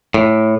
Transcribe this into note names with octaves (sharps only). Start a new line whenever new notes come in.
A2